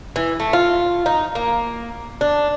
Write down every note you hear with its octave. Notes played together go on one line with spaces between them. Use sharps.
E3
A3
F4
D#4
A#3
D4